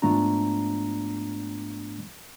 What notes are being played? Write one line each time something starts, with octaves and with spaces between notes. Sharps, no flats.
G#2 F3 A3 B3 D4 A#5